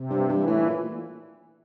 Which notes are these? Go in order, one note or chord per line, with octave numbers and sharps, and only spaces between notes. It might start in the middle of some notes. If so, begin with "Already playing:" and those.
Already playing: C3
G2
G2 E3
A2
A#2